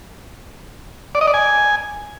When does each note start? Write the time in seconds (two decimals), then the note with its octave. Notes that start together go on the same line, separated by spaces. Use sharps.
1.15 D5
1.21 D#5
1.28 D5
1.34 G#5